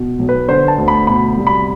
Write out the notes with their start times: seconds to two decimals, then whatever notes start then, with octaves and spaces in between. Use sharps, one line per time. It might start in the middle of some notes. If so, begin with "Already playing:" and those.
Already playing: B2
0.19 B1
0.29 B4
0.48 D3 C5
0.68 A5
0.78 D2
0.88 B5
1.07 B2 B5
1.37 C2
1.47 B5